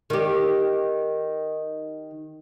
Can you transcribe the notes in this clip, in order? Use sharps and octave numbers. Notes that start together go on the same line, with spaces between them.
D#3 G4